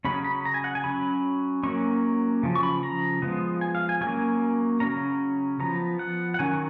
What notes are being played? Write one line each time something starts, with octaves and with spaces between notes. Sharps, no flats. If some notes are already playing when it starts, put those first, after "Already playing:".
C#3 F#3 C#4 B5
B5
A#5
G#5
F#5
G#5
F#3 C#4 B5
F#3 A#3 C#4 C#6
C#3 F3
C#6
B5
A#5
F3 G#3 B3
G#5
F5
G#5
F#3 A#3 C#4 G#5
C#3 F#3 A#3 C#4 A#5
F3 B3 A#5
F#5
F#5
D#3 F#3 C#4 G#5